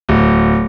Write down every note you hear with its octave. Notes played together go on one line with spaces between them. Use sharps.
D1